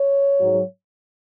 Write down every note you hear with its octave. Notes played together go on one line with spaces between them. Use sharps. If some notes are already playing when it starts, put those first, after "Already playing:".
Already playing: C#5
G#2 F#3